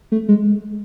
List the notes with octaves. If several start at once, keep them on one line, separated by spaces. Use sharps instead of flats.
A3
G#3